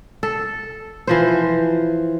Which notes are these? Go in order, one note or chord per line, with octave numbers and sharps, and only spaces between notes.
A4
E3 F3 C5